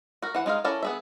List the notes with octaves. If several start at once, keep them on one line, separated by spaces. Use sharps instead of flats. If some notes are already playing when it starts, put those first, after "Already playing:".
F#4 A#4
E3 F#5
G#3 D#4 G#4 F5
C#4 E4 A4 A#4 D5
B3 G#4 E5